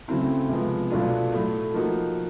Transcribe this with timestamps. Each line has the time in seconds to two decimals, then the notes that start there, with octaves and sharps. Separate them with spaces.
0.08 C#3 F#3 A3 C4 E4
0.49 C3 F3 G#3 B3
0.90 B2 F#3 A3 D4 F4
1.32 A2 F#3 A3
1.74 F3 A#3 D#4 F#4